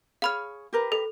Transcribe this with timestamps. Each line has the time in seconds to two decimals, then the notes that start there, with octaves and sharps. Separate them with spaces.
0.22 G#4 C#5 F5 B5 F6
0.73 G4 A#4 B4
0.92 A4